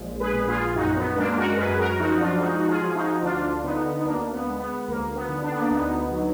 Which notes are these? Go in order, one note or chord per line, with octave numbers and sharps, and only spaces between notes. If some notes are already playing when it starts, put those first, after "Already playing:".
Already playing: A#1 G#3
G#4 B4
A#2
F4 G#4
F#2 D#4 F#4
B3
G#3 A#3 D4
F#4 A#4
F#2 G#4 B4
F#4 A#4
F3 D#4 F#4
D4 F4
G#3 D#4 F#4
F#4
F4 G#4
F3
D#4 F#4
D2 D4 F4
D3 B3 D#4
B3
D2 A#3 D4
B3
G#3
B3
D2 A#3
B3
D3
D4
B3
A#3 D4
D2 B3 D#4
F#3